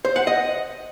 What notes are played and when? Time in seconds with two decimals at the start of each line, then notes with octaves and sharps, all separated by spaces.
0.05 C5
0.16 F#5
0.27 D#5